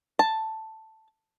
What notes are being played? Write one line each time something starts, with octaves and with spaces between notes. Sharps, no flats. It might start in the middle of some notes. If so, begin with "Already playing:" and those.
A5